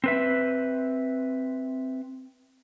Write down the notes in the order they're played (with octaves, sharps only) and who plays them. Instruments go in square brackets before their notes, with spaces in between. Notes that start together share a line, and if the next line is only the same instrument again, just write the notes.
[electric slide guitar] C4 B4 E5